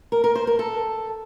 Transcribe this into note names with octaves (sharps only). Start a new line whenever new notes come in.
A#4
A#4
C5
A#4
A4